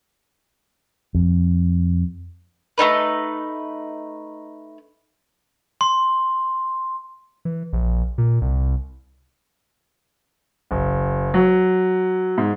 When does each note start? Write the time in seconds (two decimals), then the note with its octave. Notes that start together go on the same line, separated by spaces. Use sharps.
1.15 F2
2.78 A3 B3 D#4 B4
5.81 C6
7.45 E3
7.73 A#1
8.18 A#2
8.42 C2
10.71 F#1
11.34 F#3
12.38 G#2